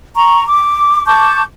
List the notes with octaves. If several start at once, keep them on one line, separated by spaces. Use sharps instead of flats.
A#5 C#6
D6
A5 C#6 D6 G6